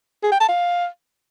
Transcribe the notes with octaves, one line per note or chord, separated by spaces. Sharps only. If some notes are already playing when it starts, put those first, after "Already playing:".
G#4
G5
A5
F5